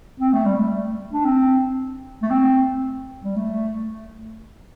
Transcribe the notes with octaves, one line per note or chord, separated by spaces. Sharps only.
C4
A3
G3
A3
D4
C4
A3
C4
G3
A3